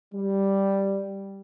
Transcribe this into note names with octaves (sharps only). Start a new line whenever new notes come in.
G3